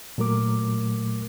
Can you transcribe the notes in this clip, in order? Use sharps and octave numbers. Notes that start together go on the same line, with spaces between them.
A#2 F#3 A3 A#4 D6